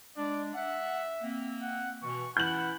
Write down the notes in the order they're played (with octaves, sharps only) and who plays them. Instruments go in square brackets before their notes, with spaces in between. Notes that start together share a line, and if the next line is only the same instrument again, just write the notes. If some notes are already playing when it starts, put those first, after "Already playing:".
[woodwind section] G#3 D4 [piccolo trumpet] D5
[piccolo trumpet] E5 [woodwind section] F#5
[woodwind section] A#3 C4
[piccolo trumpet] F#5
[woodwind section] B2 E3 [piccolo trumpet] C#6
[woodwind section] E3 C#4 E4 [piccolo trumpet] F#5 [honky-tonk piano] G6 F#7